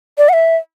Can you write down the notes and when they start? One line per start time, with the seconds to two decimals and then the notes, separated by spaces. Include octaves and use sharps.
0.18 D5
0.29 F#5
0.33 E5